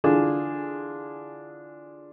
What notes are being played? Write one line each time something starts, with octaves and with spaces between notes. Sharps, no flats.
D3 E3 D4 F4 G#4